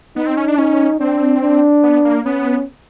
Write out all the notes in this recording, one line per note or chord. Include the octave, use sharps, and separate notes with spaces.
B3 D#4
C4
C#4
D4
C#4 D#4
C4 D4
D4
B3
A#3
B3 C#4